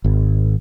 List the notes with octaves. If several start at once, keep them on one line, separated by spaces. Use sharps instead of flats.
G#1